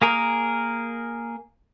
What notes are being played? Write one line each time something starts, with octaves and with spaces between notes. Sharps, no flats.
A#3 G#4 A#4